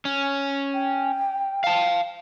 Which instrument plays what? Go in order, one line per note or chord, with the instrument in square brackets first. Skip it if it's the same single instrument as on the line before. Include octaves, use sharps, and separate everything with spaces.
[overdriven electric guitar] C#4
[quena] G5
[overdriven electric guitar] F5 A5